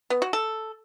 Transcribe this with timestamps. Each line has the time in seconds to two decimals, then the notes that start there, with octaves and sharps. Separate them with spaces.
0.10 B3
0.22 F#4
0.33 A4